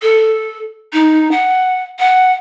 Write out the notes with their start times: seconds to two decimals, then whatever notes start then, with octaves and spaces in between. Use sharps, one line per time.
0.02 A4
0.93 D#4
1.31 F#5
1.99 F#5